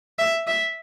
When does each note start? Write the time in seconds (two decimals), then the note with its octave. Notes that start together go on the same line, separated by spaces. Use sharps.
0.19 E5
0.47 E5